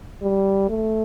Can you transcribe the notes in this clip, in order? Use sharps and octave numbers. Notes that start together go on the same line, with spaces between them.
G3
A3